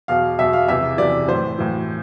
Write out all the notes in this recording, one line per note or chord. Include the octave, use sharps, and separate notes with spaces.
E2 B2 F5
E2 B2 E5
F5
E2 C3 E3 E5
E2 C3 E3 D5
A2 E3 C5
A2 E3